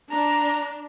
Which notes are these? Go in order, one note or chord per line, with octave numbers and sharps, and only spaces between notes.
D4 A#5